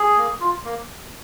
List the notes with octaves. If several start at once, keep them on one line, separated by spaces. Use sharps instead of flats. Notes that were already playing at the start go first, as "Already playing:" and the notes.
Already playing: G#4
A#3
F4
A#3